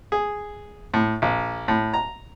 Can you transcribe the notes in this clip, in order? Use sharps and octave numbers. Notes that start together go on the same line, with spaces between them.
G#4
A2
A#1
A2
A#5